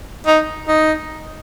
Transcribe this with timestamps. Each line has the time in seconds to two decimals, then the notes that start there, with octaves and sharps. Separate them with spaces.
0.27 D#4
0.68 D#4